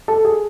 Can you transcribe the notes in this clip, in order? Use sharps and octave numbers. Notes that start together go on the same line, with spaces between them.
A4
G#4